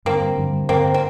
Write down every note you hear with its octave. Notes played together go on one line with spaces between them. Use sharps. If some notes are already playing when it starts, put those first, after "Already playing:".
G2 D3 G3 A#3 C4
G2 D3 G3
G2 D3 G3 A#3 C4
C4